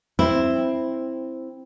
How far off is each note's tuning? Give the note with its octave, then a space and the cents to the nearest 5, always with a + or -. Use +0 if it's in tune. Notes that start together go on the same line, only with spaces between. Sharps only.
C4 +0 E4 +0